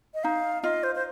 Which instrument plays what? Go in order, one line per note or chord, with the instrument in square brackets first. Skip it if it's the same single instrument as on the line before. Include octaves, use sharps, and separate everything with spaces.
[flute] D#5
[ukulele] D#4 [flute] F5
[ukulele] F4 [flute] D#5
[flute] C5
C5